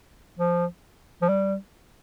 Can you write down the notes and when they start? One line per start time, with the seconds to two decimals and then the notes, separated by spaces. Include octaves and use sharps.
0.39 F3
1.22 F3
1.29 G3